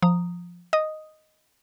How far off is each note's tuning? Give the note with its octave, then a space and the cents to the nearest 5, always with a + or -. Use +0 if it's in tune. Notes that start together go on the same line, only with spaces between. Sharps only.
F3 +5 A#5 -10 D#6 +0
D#5 +0 D#6 +0